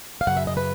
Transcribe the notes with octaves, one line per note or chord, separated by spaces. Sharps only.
F5
F#2 C#3 F#5
E5
D#5
B4